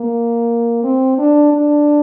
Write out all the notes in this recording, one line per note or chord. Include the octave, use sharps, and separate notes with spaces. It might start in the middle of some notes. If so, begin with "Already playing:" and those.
Already playing: A#3
C4
D4
D4